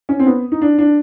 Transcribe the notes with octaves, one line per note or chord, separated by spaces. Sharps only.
C#4
C4
B3
D#4
D4
D4